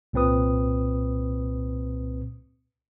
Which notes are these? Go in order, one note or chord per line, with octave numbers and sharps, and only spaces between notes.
C2 A#2 C4 B4 D#6